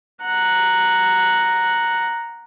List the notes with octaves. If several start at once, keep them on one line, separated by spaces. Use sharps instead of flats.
F#5 A#5